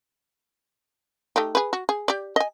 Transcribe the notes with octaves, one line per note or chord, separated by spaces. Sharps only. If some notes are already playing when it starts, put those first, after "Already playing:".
A3 D#4 G4
G#4 B4
F#4
G#4
G4 D5
D#5 G#5